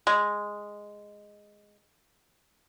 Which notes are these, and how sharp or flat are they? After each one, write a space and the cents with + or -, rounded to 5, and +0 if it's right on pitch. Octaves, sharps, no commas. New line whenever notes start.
G#3 -5